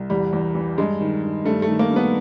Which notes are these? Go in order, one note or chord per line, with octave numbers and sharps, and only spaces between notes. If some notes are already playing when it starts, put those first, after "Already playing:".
Already playing: C2
E2 G3
E2
E3
G2 G#3
D#3
G2
G2 A3
A3
D#3
A#3
G2
B3